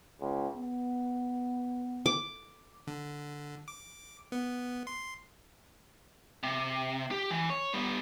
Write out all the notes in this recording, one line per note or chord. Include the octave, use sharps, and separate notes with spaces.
C#2
B3
D6
D3
D6
B3
C6
C3
G4
E3
C#5
G3 B3